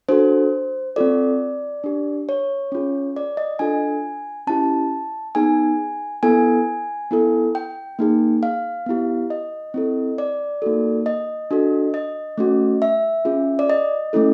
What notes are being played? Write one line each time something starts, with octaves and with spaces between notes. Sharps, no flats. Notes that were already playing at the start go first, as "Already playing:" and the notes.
D4 F#4 A4 C5
C4 F4 A4 D5
D4 G4
C#5
C#4 F4 G#4
D5
D#5
D4 F4 A4 G#5
C#4 E4 G4 A5
B3 D#4 G#4 G#5
B3 E4 A4 G#5
B3 E4 A4
G5
A#3 D#4 G#4
F5
B3 E4 G4
D#5
C4 E4 A4
D5
A#3 D#4 F#4 A4
D#5
D4 F#4 A4
D#5
A3 C#4 F#4
E5
C#4 F4 G#4
D5
D#5
A3 C#4 E4 A4